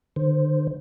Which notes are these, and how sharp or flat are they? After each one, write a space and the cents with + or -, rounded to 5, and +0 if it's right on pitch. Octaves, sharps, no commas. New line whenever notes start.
D3 +45 C5 +0